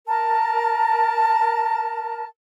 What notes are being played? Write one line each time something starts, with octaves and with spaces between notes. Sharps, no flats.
A#4 A5